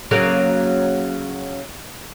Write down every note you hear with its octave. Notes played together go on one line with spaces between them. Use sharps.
C#3 F#3 A#3